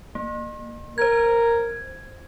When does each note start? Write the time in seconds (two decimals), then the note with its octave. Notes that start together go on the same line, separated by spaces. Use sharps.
0.15 A#3
0.98 A#4 C5 G#6